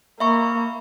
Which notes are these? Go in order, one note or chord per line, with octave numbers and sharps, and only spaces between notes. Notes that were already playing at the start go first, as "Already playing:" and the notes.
A#3 E5 B5 C#6